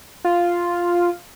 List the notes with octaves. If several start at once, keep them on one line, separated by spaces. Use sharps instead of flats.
F4